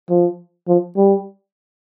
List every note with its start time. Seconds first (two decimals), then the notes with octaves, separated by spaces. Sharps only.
0.10 F3
0.68 F3
0.97 G3